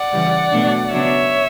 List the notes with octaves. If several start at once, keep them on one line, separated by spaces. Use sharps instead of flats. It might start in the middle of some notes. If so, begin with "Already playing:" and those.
Already playing: D5 F#5
C#3 E3 G3
B2 F#3 A3 D4
C#3 F#3 B3 D4 C#5 E5